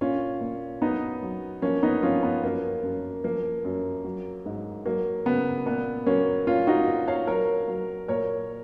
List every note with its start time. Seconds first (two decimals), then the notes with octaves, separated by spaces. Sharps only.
0.01 A#2 C#4 F4
0.41 A#2
0.82 F#2 B3 D#4
1.22 F#3
1.62 F3 A#3 C#4
1.83 B3 D#4
2.02 F3 C#4 F4
2.23 B3
2.43 F#2 A#3
2.83 F#2
3.24 F3 A#3
3.65 F#2
4.04 F#3
4.46 G#2
4.85 F#3 A#3
5.26 C#3 B3
5.66 A#2 B3
6.06 F#3 A#3 C#4
6.47 A#2 C#4 F4
6.67 D#4 F#4
6.88 A#2
7.08 C#5 F5
7.27 F#3 A#4 C#5
7.68 F#3
8.08 A#2 A#4 C#5